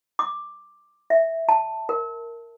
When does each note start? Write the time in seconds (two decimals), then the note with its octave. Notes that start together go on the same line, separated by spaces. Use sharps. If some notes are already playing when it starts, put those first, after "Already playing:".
0.19 D6
1.10 E5
1.49 A5
1.89 A#4